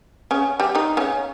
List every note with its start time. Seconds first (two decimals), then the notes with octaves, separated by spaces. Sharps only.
0.31 C#3 C#4
0.60 G3 G4
0.75 D#3 D#4
0.97 C#3 C#4